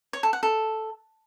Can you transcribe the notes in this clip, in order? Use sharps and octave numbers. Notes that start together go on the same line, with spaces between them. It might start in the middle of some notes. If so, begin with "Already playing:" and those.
C#5
A4
F#5
A4